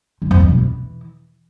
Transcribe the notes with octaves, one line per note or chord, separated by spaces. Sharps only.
D3
F2
E3
B2
E3